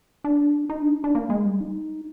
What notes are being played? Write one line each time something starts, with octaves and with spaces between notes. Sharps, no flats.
D4
D#4
D4
D#4
D4
A#3
G#3
G3
D#4